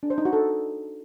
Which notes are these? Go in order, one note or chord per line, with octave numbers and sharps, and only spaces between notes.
D4
C5
D#4
F#4
A4